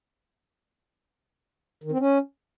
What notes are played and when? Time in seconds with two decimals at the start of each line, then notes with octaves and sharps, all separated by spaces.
1.84 D#3
1.92 C4
2.00 C#4